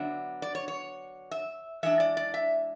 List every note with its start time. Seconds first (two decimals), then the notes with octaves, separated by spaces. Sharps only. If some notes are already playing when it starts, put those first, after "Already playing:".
Already playing: D3 F#3 B3 D4 E5
0.42 D5
0.55 C#5
0.68 C#5
1.31 E5
1.83 E3 G#3 D4 E5
2.00 D5
2.17 D5
2.34 E5